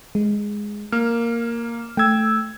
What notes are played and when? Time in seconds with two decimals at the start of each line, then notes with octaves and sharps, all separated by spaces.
0.15 G#3
0.92 A#3 F6
1.97 A3 G5 E6 G#6